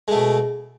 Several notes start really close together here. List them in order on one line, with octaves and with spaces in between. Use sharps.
G#3 A3 B2